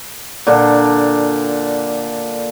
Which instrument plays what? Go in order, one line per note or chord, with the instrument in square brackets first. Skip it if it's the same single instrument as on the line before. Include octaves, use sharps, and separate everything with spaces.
[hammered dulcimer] A#2 D3 D4